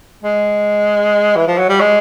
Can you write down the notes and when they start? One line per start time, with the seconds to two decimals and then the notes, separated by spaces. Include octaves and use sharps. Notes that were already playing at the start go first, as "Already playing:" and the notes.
0.24 G#3
1.36 E3
1.47 F3
1.58 F#3
1.69 G3
1.80 G#3